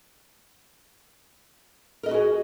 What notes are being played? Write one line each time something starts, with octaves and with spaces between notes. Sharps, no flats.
F#4 G#4 A#4 B4 D#5